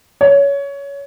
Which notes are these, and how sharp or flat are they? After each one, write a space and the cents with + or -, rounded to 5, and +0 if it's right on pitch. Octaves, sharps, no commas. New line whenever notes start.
C#5 +20